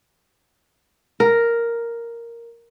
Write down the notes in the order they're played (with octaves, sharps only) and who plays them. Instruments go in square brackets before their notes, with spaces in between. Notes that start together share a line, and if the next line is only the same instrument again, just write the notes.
[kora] A#4